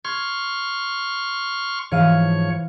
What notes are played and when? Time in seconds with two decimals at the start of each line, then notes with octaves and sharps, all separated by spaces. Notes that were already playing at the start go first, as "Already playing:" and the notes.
0.05 C6 C#6 F6 G#6
1.92 G#2 E3 F3 C#5 F5 D#7